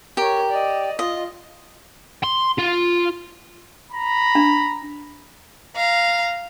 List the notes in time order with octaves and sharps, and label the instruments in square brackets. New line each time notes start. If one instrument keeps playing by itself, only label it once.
[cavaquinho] G4 [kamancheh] A#4 C#5
[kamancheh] D5 D#5
[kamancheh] F4 [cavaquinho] D#5
[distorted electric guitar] C6
F4
[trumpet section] A#5 B5
[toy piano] D4
[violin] F5 A#5